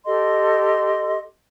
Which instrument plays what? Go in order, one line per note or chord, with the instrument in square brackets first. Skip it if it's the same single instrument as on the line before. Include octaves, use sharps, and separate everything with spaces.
[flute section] G4 A4 D#5 C6